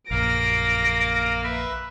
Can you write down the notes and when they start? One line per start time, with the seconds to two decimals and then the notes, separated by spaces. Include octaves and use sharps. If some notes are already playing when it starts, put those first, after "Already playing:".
0.11 A#1 F#2 A#3 F5 A#6 D7
1.43 B4 E5